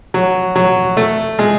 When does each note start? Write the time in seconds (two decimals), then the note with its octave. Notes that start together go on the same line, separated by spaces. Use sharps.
0.14 F#3
0.56 F#3
0.97 A3
1.39 G#3